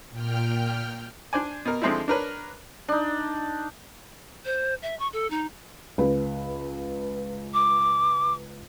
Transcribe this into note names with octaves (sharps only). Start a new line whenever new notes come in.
A#2 G5 F6
D4 C5 D5 G#5
B2 A#4
D3 F3 G#3 C4 D#4 E4
D4 A#4 B4 C#5
D4 D#4
C5
E5
C#6
A4
D#4
C#2 B4
D6